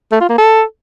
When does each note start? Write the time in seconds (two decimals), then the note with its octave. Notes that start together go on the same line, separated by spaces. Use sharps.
0.12 A3
0.21 F4
0.29 A#3
0.38 A4